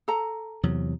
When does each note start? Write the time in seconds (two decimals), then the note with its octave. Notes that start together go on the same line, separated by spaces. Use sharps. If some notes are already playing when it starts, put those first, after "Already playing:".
0.08 A4 A#5
0.63 E2 C3 F#3